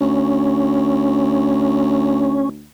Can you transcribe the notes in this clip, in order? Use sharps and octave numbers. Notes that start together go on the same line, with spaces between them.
D2 C#4